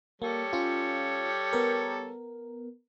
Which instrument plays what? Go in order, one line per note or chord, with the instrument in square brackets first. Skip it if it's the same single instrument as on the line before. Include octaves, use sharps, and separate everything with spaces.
[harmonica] G3 A4 C#5 [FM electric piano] A#3
[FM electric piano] C#4 F4
B3 A#4